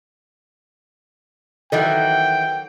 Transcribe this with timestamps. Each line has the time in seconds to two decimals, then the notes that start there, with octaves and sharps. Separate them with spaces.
1.72 D#3 E3 F#3 A4 D#5 G5